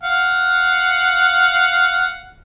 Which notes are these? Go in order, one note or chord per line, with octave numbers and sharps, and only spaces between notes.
F5 F#5